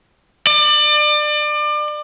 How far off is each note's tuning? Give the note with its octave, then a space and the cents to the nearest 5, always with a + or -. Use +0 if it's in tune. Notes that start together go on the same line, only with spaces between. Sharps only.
D5 +30